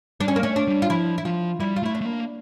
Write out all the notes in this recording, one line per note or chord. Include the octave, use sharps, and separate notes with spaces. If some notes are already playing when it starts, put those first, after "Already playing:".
G3 D4
C#4
A#3
A3 C#4
D4
G3
F4
F3 E4
E4
F3 F4
G3 E4
F4
A3 E4
D4
A3
A#3